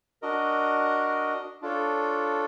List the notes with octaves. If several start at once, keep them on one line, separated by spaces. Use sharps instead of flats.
D4 F#4 A#4 D#5
D4 F4 A4 C#5